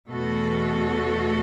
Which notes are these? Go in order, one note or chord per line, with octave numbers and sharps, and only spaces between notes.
E2 B2 A3 F#4 A4